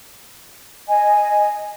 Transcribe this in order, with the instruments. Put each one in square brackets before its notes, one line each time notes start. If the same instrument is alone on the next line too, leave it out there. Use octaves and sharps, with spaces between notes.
[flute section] D#5 G#5